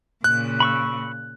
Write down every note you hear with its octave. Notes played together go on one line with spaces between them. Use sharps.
A#2 C#3 F#6
B5 C#6 E6